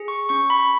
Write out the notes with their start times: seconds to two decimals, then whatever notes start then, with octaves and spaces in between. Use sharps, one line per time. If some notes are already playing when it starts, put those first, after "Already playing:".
Already playing: G#4
0.08 C#6
0.29 C#4 C#6
0.50 B5